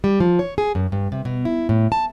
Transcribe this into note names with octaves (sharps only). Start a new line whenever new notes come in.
G3
F3
C#5
G#4
F#2
G2
C3
B2
E4
A2
A5